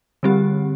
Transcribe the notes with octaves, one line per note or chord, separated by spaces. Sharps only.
D3 G3 C4 G4